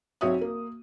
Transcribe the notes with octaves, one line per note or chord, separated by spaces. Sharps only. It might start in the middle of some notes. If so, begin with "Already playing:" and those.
B1 C4 F#4 C#5 E5 D#6
A#3